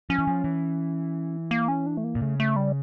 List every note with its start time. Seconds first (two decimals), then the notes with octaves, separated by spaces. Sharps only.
0.10 F3 C#4
0.19 E3
0.27 F3
0.44 E3
1.51 A#3
1.68 C#4
1.86 D4
1.97 A3
2.04 A#3
2.15 A#2
2.22 C#3 A3
2.40 A3
2.56 G3